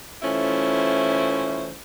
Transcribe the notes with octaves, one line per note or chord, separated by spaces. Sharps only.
E3 A3 C#4 E4 F4 C5